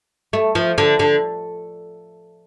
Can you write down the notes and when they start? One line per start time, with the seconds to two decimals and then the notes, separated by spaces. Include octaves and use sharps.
0.33 A3
0.55 F3
0.78 D3
0.99 D3